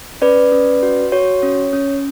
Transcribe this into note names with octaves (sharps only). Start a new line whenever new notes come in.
C#4 B4 D5
C#4
F#4
F#4 C#5
C#4
C#4